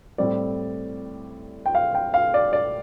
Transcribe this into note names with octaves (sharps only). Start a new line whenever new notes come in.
A2 G3 C4 D5
G5
F5
G5
F5
D5
D5